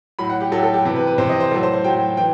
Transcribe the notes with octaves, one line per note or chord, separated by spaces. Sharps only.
A2 F#3 B5
F#5
G4
A2 F#3 A4
G4
A4
G4
C3 E3
B4
B4
C3 E3 C5
D#5
C5
A2 F#3 A4
C5
C5
A2 F#3 G5
E3 G5